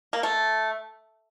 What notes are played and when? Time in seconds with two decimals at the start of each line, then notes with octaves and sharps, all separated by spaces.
0.13 A#3
0.23 A3